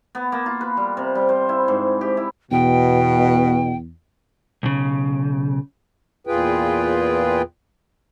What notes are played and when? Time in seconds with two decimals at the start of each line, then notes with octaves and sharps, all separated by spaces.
0.15 B3
0.32 A#3
0.46 F4
0.61 B4
0.77 G3
0.97 C3
1.15 G3
1.29 C5
1.49 E4
1.68 G#2
2.01 G4
2.17 E4
2.51 E2 B2 G5
4.63 B1 C#3
6.27 E2 A#2 F4 G#4 B4 G5